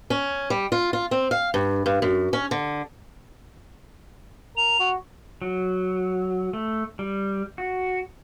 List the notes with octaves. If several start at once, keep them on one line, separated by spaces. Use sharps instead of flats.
C#4
G3
F4
F4
C4
F5
G2
G2
F#2
C#4
D3
A#4 F7
F#4
F#3
A3
G3
F#4